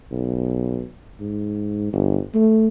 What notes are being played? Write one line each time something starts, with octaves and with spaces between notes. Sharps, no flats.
B1
G#2
G1
A3